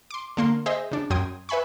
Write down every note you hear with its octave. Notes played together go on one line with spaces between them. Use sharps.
C6 D6
D3 A#3 C6
G#4 C5 D#5 E5
C#3 D4
F#2 G5 C6 D#6 G#6
B4 E5 G#5 B5 C#6